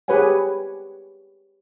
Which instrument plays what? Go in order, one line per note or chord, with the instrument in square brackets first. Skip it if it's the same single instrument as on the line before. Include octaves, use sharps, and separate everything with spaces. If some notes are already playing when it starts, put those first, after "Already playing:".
[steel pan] G4 G#4 B4 C#5 F#5 G#5